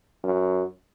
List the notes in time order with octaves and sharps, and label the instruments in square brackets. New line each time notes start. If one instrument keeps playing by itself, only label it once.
[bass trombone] F#2